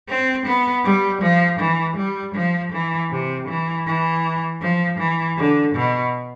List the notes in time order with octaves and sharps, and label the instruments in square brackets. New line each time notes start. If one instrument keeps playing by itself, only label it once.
[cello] C4
B3
G3
F3
E3
G3
F3
E3
C3
E3
E3
F3
E3
D3
B2